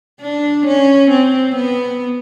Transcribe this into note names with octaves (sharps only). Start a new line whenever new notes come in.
D4
C#4
C4
B3